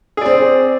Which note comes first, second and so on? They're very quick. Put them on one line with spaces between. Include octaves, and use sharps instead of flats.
G#4 D5 C4